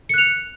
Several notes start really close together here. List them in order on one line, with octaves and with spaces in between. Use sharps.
C#7 F#6 F7